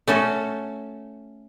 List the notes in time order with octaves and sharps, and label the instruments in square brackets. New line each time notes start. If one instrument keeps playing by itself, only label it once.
[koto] A3 C#4 F#4 A4